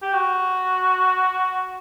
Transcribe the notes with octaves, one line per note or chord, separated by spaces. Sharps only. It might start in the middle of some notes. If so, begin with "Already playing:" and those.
G4
F#4